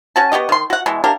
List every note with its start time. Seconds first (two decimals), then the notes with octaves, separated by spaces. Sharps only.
0.16 C#4 F#4 A5
0.32 B3 F#4 G4 D#5
0.49 D#3 C6
0.70 F#4 F#5
0.86 B2 E3 G#3
1.04 A#3 D4 G4 A#4